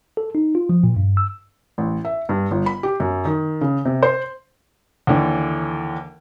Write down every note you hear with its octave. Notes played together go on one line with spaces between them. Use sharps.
A4
D#4
F4
F3
A#2
G2
E6
A1
E5
G2
G1
B5
G4
F#2
D#3
C#3
C3
C5
D#2 D3 E3